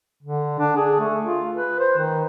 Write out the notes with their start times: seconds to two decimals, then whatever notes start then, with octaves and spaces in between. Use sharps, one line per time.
0.23 D3
0.59 D4
0.76 G#4
1.00 A3
1.25 F4
1.55 B4
1.79 C5
1.98 D#3